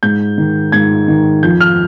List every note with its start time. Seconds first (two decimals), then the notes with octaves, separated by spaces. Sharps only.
0.03 G#2 G6
0.38 D#3
0.72 G#2 G#6
1.08 D#3
1.43 F2 G6
1.61 F6